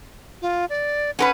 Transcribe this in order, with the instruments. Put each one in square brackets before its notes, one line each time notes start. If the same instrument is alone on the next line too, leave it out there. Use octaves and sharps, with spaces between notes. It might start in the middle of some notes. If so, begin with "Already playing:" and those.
[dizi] F4
D5
[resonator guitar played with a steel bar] C#4 A#4 B4 [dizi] F#5